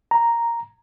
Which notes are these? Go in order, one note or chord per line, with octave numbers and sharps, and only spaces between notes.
A#5